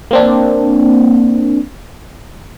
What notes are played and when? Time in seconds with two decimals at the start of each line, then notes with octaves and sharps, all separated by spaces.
0.11 A#3 C4 D4